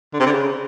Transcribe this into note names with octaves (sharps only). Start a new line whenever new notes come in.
D3
C3
D3
C#3